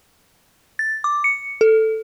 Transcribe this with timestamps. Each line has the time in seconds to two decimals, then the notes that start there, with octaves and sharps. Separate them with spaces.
0.79 A6
1.04 D6
1.24 C#7
1.61 A4